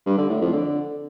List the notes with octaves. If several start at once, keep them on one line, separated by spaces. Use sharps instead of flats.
G2
D3
A2
F2
D3